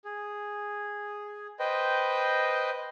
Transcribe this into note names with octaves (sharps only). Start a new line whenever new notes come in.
G#4
B4 C5 D#5 G5